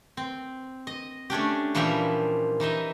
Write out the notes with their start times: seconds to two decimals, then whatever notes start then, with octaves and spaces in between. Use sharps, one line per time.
0.17 C4
0.87 D#5
1.30 A3 C#4 D4 G4
1.75 A#2 E3 F3 G3 G4 E5
2.60 E3 D#4 D#5 E5